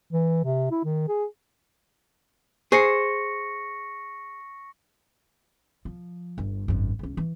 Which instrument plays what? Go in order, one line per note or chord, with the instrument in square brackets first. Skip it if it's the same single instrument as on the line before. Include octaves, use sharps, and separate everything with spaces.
[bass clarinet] E3
C3
E4
D#3
G#4
[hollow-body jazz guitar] G#4 C5 [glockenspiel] C#6 A#6 C#7
[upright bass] F3
G1
G#1 F#2
C#2 C#4
E3